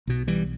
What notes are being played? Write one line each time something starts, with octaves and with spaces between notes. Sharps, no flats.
B1 B2
E3 G3